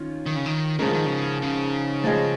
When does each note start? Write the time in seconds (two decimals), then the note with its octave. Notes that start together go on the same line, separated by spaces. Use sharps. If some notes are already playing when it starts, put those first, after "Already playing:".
Already playing: D#3 C#4 F4
0.26 D#3
0.36 C#3
0.46 D#3
0.79 G#2 C#3 F3 G#3 D#4 A#4
0.93 D#3
1.06 C#3
1.42 C#3
2.04 F3 G#3 C#4 G#4 D#5